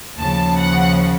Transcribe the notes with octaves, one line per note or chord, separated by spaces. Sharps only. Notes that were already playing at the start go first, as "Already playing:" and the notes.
D#2 C#3 F3 A5
F#5